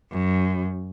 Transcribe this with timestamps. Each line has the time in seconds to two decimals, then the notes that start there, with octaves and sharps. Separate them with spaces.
0.12 F#2